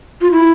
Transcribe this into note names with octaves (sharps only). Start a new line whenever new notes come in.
F4
E4